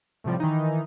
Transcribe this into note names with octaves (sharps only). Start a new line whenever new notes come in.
A2 C3 F3 G3
D#3 E3 D#4